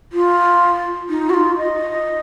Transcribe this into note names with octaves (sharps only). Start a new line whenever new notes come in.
F4
D#4
F#4
F4
D#5